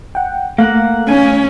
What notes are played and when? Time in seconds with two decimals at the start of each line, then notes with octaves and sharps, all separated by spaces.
0.15 F#5 G5
0.58 A3 A#3 F5 F#5
1.09 C#4 G#5